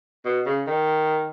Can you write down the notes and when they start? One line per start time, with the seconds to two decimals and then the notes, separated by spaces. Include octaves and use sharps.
0.25 B2
0.46 C#3
0.67 D#3